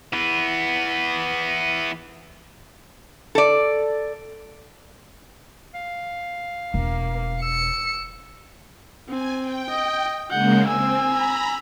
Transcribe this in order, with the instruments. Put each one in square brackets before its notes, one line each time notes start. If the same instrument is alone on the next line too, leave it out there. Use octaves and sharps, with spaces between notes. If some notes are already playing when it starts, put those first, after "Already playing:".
[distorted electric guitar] E3 B3
[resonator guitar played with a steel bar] A4 D5
[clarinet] F5
[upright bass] E1 [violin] A#3
[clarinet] E6 [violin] C#7
[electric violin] C4 [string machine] G#5
[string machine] G5
[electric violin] D#5
[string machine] C#3 G#3 A#3 [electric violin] F#5 G6
[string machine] C4 [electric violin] G#5 E6
[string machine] A#5 B5